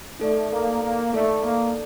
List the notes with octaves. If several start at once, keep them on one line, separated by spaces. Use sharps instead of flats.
A3 D#4 A4 D5
A#3
A#3
A3 D#4 A4 D5
A#3